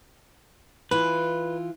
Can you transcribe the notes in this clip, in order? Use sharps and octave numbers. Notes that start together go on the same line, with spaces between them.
E3 F4 B4